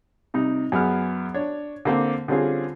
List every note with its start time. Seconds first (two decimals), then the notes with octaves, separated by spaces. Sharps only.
0.34 C3 G3 D#4
0.72 F#2 B3 G#4 F6
1.34 D4 C#5
1.85 D3 A#3 C4
2.28 D3 G3 C4 C#4 F4 G#4